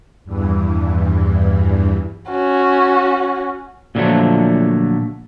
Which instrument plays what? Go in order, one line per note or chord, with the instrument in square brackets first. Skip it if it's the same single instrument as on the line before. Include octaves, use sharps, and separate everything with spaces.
[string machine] E2 G2 E3
[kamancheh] C#4 F#4
[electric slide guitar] A#2 D3 F3 F#3 A3